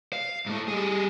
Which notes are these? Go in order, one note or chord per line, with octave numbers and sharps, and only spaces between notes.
F5
G#2 A3
G3 G#4